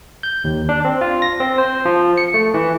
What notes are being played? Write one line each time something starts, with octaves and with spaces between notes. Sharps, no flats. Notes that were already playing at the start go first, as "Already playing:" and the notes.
G6
D#2
D4
C4
F4
A#6
C4
C5
F3
C#7
A3
E3